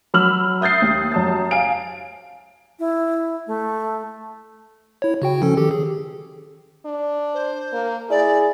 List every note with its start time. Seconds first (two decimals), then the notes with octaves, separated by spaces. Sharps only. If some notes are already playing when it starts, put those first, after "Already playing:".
0.14 F#3 B5 E6 F6 F#7
0.61 E5 D#6 G6 A6 C7
0.82 D#2
1.12 F#2 A5 A6
1.51 F5 G#5 D7
2.79 E4
3.47 A3
5.02 E4 C#5
5.22 C#3 F#4 G5
5.42 F3 C#4 A4
5.57 D#3 G4 A4
5.71 G#4
6.85 D4
7.34 C5
7.73 A#3
8.10 E4 G#4 D5